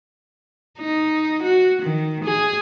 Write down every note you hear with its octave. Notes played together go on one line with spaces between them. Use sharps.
D#4
F#4
D#3
G#4